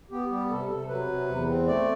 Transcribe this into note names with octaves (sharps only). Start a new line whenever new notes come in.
B3 G4
G3 G4
C3 A4
C3 A4
F#3 B4
C3
E2
C4
A3 D5